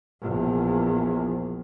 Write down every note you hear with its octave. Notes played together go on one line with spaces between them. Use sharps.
A#1 E2